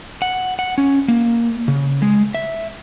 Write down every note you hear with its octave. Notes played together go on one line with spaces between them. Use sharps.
F#5
F#5
C#4
A#3
C#3
G#3
E5